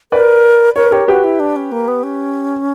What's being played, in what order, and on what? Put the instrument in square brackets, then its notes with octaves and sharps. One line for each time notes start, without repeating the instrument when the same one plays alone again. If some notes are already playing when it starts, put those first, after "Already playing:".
[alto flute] A#4 [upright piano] B4 D5
[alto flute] A#4 [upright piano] C#5
[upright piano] B4
[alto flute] G4 [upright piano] A#4 C#5
[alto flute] F#4 [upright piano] G4 B4
[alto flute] E4
D4
C#4
A#3
B3
C#4